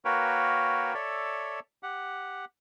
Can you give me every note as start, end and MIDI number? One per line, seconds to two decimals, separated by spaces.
0.05 0.94 58
0.05 0.94 66
0.05 0.94 70
0.05 0.94 71
0.05 0.94 73
0.05 0.94 79
0.94 1.60 69
0.94 1.60 73
0.94 1.60 74
0.94 1.60 76
1.83 2.45 67
1.83 2.45 78